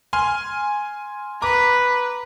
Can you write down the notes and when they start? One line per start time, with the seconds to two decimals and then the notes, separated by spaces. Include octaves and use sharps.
0.13 G#5 C6 F6
1.42 B4 A#5 D6